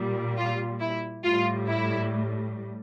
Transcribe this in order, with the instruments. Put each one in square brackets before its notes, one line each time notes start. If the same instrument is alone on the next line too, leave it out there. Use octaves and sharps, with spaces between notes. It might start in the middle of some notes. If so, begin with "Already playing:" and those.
Already playing: [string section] A#2 G3
F4
E4
A2 G3 F4
E4